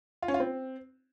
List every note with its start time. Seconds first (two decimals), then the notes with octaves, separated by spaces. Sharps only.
0.22 F4
0.28 C#4
0.34 F4
0.40 C4